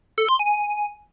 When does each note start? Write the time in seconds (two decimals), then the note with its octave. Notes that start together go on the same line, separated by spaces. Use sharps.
0.18 A4
0.29 C6
0.39 G#5